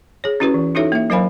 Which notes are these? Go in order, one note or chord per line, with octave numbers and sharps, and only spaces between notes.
G#4 C#5
C#4 E4 F#4 G4 B4
E3
D#4 E4 F#4 A4 C#5 E5
A#3 E5
F#3 A#4 C5 F5 G#5 B5